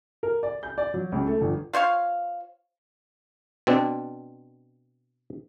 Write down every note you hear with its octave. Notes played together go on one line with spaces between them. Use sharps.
A#4
D5
G6
D5
F#3
C#2
A3
G1
F4 C5 C#5 F5
B2 C4 D4